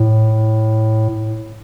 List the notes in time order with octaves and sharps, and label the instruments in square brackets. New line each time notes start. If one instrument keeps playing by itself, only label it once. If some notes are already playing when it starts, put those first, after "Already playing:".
Already playing: [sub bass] A2